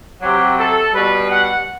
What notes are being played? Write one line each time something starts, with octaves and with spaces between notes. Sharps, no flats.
C3 F#3 G4
A4
B2 G3 B4
F#5